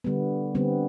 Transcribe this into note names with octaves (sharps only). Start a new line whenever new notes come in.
D3 G3 B3
D3 G3 B3 C4